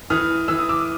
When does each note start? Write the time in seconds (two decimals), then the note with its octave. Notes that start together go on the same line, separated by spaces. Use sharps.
0.10 E3 D#6 F6
0.48 E3 E6
0.59 D#6
0.69 D6 E6